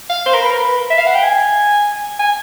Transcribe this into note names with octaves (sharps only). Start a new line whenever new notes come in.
F5
C5
A#4
B4
A#4
B4
E5
F5
F#5
G5
G#5
G#5